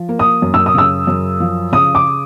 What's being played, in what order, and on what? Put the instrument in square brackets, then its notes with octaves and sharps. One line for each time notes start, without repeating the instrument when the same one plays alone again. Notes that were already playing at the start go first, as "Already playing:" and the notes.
Already playing: [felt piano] F3
A#3
[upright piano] D#6
[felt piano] F#2
[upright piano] E6
D#6
[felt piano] C#3 [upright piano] E6
[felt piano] F#2
F3
[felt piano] C#3 [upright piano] D#6
[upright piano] D6